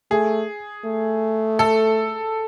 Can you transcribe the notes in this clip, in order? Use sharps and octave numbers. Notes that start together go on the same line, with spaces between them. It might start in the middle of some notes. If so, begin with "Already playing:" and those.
A3 G#4
A3
A4